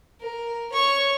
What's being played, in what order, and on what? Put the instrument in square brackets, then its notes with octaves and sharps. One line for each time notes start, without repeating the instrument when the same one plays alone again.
[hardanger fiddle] A#4
C#5 C#6